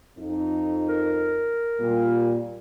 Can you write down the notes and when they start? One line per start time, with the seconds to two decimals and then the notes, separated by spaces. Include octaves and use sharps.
0.18 F2 D#4
0.88 A#4
1.79 A#2 G3